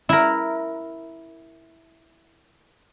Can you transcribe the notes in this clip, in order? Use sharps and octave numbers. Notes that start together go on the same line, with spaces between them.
E4 A#4